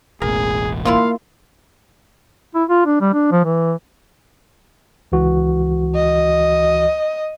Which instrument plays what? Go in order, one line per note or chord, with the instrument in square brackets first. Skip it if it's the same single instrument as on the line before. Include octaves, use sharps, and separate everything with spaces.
[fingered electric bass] E1 A1 E2 [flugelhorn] G#4 [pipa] A#4
[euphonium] A#3 [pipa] E4 F4 C6 [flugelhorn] F5
[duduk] E4
F4
D4
G3
D4
F3
E3
[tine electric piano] C#2 E3 F#4
[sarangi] D#5